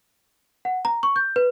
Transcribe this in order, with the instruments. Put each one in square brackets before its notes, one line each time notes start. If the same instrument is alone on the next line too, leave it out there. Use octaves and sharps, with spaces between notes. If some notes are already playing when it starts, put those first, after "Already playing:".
[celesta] F#5
A#5
C#6
G6
B4